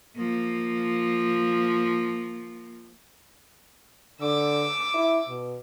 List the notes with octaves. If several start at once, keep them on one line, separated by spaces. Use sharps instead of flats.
F3 A#3
D3 D6 E6
E4
B2